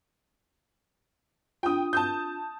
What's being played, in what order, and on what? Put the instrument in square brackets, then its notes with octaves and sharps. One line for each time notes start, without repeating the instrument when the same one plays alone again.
[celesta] D4 F4 [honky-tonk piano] G5 D#6
[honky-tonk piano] A5 D#6 G6